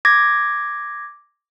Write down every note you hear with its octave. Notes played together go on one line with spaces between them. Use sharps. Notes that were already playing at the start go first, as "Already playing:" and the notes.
D6 G#6 A#6